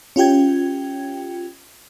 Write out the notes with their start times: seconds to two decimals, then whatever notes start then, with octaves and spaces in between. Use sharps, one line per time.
0.16 C#4 F4 G4 G5 G#6